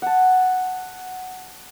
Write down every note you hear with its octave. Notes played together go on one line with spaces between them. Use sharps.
F#5 A5